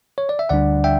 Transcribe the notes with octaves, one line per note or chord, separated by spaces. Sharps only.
C#5
D5
E5
D2 D3 G3 D4 D5 F#5
E5 G5